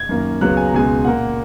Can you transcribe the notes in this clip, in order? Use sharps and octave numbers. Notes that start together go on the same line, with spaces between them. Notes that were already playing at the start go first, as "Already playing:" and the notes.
Already playing: G#6
F#2 D#3 A#3
C#2 C#3 F#3 B3 F#6
G#5
A#5
C#2 B2 G#3 B3 G#5
A#2 A#3 F#5